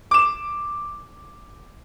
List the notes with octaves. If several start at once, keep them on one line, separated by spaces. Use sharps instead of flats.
D6 E7